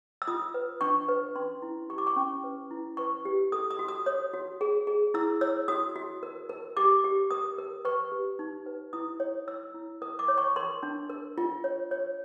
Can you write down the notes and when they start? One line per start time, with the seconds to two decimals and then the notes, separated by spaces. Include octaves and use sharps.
0.22 E6
0.27 F4 D#6
0.54 B4
0.81 D4 C#6
1.09 B4
1.35 C#4 C6
1.62 E4
1.89 G4 C#6
1.98 D6
2.07 C#6
2.16 C#4
2.44 B4
2.71 E4
2.97 B4 C#6
3.25 G4
3.52 A4 D#6
3.71 D#6
3.79 F#4
3.88 D#6
4.06 C#5 D#6
4.33 F#4
4.61 G#4
4.87 G#4
5.14 E4 E6
5.41 C#5 E6
5.68 F#4 D#6
5.96 F#4
6.23 A#4
6.49 A#4
6.77 G4 D6
7.04 G4
7.31 A#4 D#6
7.58 A#4
7.85 B4 C#6
8.12 G4
8.39 D#4
8.66 B4
8.93 E4 D#6
9.20 C#5
9.48 C#5 E6
9.74 E4
10.02 A#4 D#6
10.19 D6
10.28 C#5
10.38 C#6
10.56 A#4 C6
10.83 D4
11.10 A#4
11.38 F4
11.64 C#5
11.91 C#5